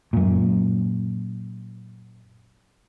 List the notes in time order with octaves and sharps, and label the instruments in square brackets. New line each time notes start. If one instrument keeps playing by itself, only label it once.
[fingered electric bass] F#2 A#2